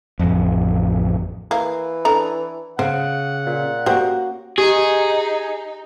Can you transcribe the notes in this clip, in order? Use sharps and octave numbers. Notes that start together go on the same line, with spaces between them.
A1 F2
E3 A#3
D4 A4 A#5
C#3 C5 F#5
A#2
A#3 C#4 F#4 G4 C5
D#4 G4 G#4